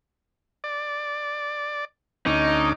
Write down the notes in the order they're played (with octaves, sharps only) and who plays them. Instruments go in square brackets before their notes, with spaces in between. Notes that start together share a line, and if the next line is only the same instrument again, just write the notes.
[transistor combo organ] D5
[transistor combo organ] D2 C#4 D6 [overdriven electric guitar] D#4